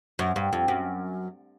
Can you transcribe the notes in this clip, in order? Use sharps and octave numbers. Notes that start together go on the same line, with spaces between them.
F#2
G2
F2
F#2